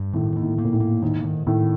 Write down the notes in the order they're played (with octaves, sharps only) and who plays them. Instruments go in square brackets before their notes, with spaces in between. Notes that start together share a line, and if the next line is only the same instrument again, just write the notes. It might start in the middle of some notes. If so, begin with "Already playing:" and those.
Already playing: [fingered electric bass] G2
[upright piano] A2 [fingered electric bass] D#3
[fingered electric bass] A#3
[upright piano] A2
[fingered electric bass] A#3
[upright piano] A#2
A2
[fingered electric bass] A#3
[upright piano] G#2 [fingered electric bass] D#3
[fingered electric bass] D#3
[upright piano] A2 [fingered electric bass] D#3